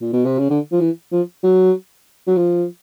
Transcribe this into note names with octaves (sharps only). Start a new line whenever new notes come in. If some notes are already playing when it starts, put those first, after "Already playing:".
A#2
B2
C3
C#3
D3
F3
E3
F3
F#3
F#3
F3